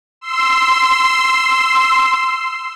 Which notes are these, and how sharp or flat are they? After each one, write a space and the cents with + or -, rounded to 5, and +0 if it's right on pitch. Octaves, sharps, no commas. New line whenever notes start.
C6 -5 E6 +0